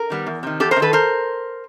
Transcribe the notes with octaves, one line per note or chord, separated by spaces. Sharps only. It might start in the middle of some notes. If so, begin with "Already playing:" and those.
Already playing: A#4
D#3 G3 B3
E2
C3 D#3
E2 G4 A4
A#4 C5
C3
D#3 A4 B4
A#4 C5